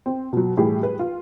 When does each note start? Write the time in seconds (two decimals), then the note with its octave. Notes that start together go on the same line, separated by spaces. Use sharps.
0.06 C4
0.33 B2 F#3
0.57 A2 E3 G3 G4 G#4
0.80 G#4 B4
0.99 F4